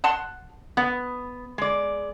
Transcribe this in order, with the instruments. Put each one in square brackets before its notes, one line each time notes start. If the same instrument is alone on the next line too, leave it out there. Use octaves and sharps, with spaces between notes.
[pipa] F#5 A5 C6
[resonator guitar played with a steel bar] B3 [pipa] F#5
[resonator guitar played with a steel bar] G#3 D5